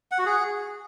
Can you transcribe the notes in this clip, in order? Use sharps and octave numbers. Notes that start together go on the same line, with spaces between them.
F#5
F#4
G#4